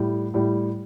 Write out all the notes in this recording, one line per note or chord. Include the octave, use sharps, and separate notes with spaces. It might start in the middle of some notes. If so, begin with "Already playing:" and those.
Already playing: A2 G3
A2 G3